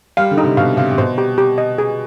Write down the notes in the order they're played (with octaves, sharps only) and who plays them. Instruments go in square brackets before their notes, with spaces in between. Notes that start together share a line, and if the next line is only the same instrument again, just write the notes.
[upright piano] G3 [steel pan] F5
[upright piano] D3
[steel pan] D#4
[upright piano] C3
[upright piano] B2 [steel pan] F5
[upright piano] C3 [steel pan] F5
[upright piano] C3
[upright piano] B2 [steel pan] C5
[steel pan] G4
G4
D#5
G#4